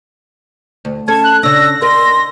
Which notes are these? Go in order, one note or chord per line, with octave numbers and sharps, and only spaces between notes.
D2
C#4 A4 A5 G#6
F#6
C#3 D4 E6 A#6
A#4 D#5 C6